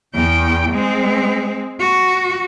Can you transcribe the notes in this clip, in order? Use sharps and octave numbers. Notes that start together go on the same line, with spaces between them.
E2 G5
G#3 C4
F#4